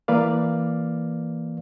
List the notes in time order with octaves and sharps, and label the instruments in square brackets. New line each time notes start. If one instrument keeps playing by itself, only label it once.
[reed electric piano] E3 A#3 B4 D5 F5